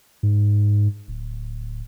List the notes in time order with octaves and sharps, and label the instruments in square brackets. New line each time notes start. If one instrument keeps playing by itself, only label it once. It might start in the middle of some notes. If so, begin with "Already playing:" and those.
[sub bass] G#2
D1